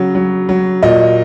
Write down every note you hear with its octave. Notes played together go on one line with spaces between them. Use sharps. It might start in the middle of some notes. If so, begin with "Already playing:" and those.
Already playing: C#3 F#3
F#3
F#3
A#2 D#5